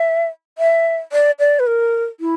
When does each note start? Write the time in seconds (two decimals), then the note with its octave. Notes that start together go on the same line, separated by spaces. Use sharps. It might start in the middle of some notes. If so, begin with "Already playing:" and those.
Already playing: E5
0.58 E5
1.12 D5
1.39 D5
1.59 B4
1.67 A#4
2.20 E4